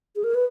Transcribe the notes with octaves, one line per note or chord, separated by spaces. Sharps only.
G#4
A#4
B4